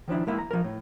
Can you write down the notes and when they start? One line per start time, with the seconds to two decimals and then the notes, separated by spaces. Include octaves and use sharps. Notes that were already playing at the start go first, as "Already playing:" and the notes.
0.08 D#3 F3 D4 E4
0.27 G#3 A#3 E4
0.38 A#5
0.51 F3 A#4
0.64 A2